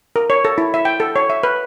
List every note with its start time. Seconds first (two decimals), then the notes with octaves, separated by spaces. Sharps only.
0.16 A#4
0.30 C#5
0.45 A4
0.58 E4
0.74 E5
0.85 G5
1.00 A4
1.16 C#5
1.30 E5
1.43 B4